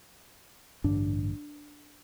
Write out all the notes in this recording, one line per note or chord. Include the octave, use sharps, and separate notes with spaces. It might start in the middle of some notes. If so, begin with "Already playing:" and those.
A1 G2 D3 D4